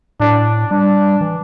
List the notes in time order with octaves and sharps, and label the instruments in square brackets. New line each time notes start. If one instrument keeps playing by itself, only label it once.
[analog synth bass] A2 [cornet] D4
[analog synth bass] G3 [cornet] D4
[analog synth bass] E3